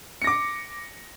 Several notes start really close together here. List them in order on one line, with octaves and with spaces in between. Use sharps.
C#7 A#6 D6